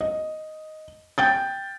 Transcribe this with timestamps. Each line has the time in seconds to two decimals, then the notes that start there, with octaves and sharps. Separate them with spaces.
0.01 D#5
1.18 G5 G6 A6